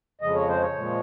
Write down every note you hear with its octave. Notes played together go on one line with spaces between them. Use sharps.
F2 C#3 F3 G#3 D#5
C#5
C5
C#5
A#2 F3 G#3